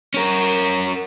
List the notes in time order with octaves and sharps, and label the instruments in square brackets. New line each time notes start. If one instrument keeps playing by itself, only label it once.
[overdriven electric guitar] C#4 A#4